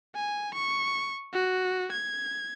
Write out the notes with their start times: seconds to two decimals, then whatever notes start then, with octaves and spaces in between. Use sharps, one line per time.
0.15 G#5
0.54 C#6
1.33 F#4
1.92 G#6